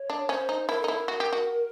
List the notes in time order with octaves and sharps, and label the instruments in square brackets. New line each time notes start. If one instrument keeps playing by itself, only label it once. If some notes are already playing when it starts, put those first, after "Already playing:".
Already playing: [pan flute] C#5
[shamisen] D4
[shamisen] C#4 [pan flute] C5
[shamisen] D#4
[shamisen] E4 [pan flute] A#4
[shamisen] D#4 [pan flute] A4
[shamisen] E4
[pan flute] A#4
[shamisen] F#4
G4
F#4